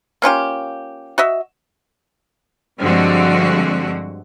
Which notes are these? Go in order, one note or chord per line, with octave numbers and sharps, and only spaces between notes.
A#3 C#4 F4 G4
F#4 D#5 E5
G2 D3 F3 G#3 C4 F#4